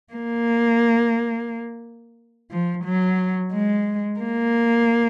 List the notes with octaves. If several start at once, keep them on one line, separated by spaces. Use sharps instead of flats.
A#3
F3
F#3
G#3
A#3